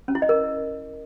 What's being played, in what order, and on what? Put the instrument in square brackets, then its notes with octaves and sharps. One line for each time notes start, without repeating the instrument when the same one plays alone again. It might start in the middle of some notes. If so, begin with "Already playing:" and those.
[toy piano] C#4
E4
D#5
A#4